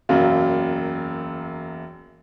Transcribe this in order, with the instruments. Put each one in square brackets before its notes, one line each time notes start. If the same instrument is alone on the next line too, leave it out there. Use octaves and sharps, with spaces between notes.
[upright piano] E1 F#2 F#3 A#3